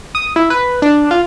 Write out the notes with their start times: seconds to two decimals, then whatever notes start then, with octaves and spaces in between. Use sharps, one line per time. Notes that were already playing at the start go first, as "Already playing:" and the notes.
0.15 D#6
0.36 E4
0.50 B4
0.82 D4
1.11 F4